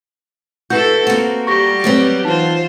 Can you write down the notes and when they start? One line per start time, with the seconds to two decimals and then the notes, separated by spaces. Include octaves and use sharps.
0.70 E4 F#4 A4 B4 G6
1.07 A#3 C4 F#4
1.47 G3 G4 C#6 A#6
1.84 F#3 B3 C4
2.24 E3 D#4 F4 C5 A5